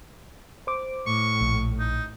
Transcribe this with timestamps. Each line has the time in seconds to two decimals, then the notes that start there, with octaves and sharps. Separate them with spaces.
0.67 C5 D6
1.07 A2 C#6
1.41 A#1
1.79 D#4